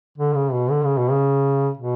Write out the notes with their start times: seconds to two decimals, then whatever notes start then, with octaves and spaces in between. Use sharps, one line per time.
0.18 D3
0.35 C#3
0.53 B2
0.71 D3
0.85 C#3
0.98 B2
1.11 C#3
1.77 B2